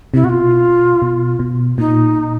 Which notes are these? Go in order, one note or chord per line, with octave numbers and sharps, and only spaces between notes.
C3 E4
B2 F#4
F4
B2
B2
A#2 D#4